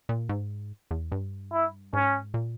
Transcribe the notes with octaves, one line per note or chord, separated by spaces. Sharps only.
A#2
G#2
E2
G2
E4
G#2 C#4
A#2